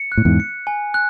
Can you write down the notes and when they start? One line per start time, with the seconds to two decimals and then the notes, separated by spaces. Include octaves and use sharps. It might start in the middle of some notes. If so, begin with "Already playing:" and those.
Already playing: C#7
0.12 F#6
0.17 A2
0.25 E2 G#2
0.40 C#7
0.67 G#5
0.94 F#6